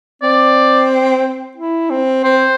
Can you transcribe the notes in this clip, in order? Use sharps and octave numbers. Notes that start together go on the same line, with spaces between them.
C4 D5
E4
C4
C4 C5